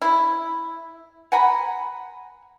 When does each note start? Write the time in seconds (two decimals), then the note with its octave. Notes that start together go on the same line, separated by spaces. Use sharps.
0.02 E4
1.32 F#5 G#5 A#5 B5